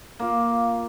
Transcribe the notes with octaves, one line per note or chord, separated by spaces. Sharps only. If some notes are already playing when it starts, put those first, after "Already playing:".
A#3 F4